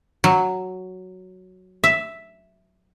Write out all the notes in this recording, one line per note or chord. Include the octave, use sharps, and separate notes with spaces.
F#3
E5